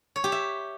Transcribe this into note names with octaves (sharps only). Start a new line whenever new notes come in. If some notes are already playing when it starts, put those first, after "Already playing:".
C#5
G4
E5